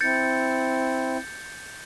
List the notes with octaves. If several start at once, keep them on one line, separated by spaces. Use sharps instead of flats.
C4 E4 G6 A6 C#7